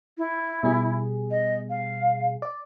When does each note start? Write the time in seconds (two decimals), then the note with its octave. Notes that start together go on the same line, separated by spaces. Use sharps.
0.18 E4
0.63 B2 G3 G#4
1.31 D#5
1.69 F5
2.42 D5